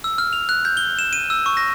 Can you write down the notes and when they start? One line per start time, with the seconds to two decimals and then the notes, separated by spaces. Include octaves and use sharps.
0.04 E6
0.18 F6
0.33 F7
0.49 F#6
0.65 G6
0.77 G7
0.99 E7
1.13 D#7
1.30 E6
1.46 C#6
1.57 A#6